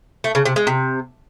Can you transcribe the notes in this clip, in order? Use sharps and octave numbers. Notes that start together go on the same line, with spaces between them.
A3
C#3
C3
G#3
C3